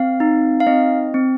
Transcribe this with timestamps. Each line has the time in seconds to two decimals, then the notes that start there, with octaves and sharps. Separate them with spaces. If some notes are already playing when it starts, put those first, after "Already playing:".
Already playing: C4 F5
0.20 D#4
0.60 F5
0.67 C4 D#5
1.14 C4